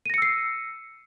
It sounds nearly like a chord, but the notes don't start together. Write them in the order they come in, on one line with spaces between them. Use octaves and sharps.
D#7 A#6 C#7 E6 C7